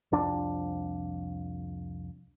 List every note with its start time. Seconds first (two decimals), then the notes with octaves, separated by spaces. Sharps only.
0.12 C2 F2 D4